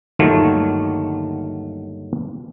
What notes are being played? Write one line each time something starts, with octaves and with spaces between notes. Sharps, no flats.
G1 D#2 D#3 F#3 A3 F4